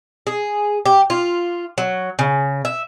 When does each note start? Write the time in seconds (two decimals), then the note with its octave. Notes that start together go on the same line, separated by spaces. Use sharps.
0.27 G#4
0.86 G4
1.10 F4
1.78 F#3
2.19 C#3
2.65 E5